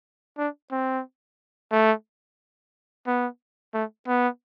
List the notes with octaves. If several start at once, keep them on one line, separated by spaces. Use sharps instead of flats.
D4
C4
A3
B3
A3
B3